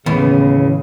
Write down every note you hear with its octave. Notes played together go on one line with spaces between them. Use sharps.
D#2 A2 C#3 E3 B3